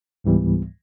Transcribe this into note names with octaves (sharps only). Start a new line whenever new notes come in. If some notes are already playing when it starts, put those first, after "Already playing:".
C#2 G#2 E3 G3 B3